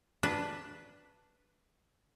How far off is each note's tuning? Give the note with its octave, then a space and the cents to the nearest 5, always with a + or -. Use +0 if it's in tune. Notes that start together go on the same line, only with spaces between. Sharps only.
D4 +0 B4 -5